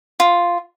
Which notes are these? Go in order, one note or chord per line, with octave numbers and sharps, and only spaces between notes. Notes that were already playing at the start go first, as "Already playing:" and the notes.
F4